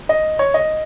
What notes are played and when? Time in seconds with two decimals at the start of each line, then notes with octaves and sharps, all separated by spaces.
0.09 D#5
0.39 C#5
0.54 D#5